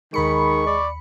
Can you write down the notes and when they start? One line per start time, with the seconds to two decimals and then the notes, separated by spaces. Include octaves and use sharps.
0.14 D#2 D#3 G#3 B5 C#6 C#7
0.67 D5